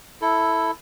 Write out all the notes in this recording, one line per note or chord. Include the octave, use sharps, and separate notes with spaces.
E4 A4